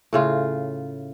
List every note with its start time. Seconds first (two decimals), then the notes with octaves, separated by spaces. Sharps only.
0.13 A2 C#3 F4